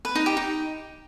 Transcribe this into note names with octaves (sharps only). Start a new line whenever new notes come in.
B4
D#4
G4
D#4